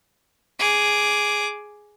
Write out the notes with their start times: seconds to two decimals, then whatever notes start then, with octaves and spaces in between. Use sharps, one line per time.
0.59 G#4 D6